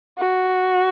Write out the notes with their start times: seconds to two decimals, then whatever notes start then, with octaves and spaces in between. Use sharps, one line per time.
0.18 F#4